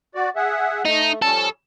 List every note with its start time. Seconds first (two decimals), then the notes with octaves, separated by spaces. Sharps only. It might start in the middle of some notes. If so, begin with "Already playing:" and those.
0.15 F#4 D5
0.36 G#4 E5 F#5
0.86 A3 D#4
1.22 F3 G3 C#4 A4